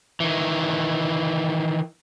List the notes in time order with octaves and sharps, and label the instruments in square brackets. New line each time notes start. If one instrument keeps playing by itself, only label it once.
[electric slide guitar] D#3 E3